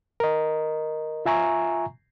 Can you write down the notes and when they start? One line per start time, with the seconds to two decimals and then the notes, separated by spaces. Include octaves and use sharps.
0.20 A#4 D#5
1.26 F4 E5 G#5 A#5 C#6